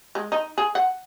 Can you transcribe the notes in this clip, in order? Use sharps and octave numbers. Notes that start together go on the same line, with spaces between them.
G#3
D#4
G#4
F#5